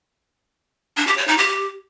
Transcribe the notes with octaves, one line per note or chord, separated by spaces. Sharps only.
D4
G4
C#5
D#4
G4